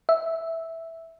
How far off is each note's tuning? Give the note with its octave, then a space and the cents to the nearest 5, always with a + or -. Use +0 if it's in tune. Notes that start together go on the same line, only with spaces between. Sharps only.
E5 -5